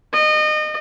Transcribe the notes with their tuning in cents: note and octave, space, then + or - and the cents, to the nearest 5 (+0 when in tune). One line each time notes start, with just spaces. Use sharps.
D#5 -30